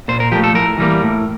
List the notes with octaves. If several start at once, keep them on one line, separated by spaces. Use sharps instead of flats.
A#2 C5
A#4
F3 A3 G4
A4
A2 A#4
E3 G3 A#3
A2